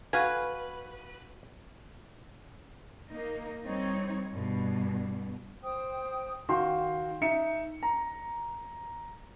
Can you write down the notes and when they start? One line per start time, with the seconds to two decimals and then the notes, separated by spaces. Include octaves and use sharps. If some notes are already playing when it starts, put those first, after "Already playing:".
0.13 F#4 B4 F5 G#5
3.11 A#3 D#4
3.63 G3 C4 D#4 C#5
4.30 G2 B2
5.62 C5 G5 D#6
6.49 D#3 F#4 F5 G5 C6
7.21 D#4 E5 C#7
7.83 A#5